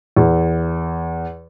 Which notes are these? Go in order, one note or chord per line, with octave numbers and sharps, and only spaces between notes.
E2